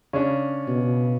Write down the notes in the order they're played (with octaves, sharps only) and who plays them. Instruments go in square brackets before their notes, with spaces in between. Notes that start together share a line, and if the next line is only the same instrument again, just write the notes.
[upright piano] C#3 [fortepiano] C#4 D4
[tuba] B2